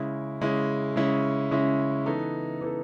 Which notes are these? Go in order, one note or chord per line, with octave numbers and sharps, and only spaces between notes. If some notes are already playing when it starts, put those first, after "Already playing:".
Already playing: C#3 G#3 C#4 E4
C#3 G#3 C#4 E4
C#3 G#3 C#4 E4
C#3 G#3 C#4 E4
E3 B3 D#4 A4
E3 B3 D#4 A4